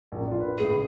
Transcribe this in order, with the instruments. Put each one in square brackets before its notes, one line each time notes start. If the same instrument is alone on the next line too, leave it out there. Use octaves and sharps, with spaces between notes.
[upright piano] A#1 F#2
D4 F4
B4
[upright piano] A2 D#7 [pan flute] G#4
[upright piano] A1 C#3